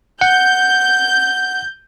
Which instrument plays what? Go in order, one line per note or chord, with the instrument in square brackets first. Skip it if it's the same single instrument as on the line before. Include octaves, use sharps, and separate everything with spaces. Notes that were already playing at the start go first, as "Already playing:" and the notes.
[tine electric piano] F#5 [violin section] G6